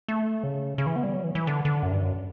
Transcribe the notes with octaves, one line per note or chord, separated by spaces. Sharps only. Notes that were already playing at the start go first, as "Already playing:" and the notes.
A3
C#3
C#3
E3
B3
G3
F#3
E3
E3
D3
D3
F#2
G2
F#2